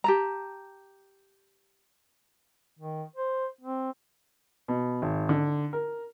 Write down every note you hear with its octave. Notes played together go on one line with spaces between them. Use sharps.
G4 A5 A#5
D#3
C5
C4
B2
G#1
D3
A#4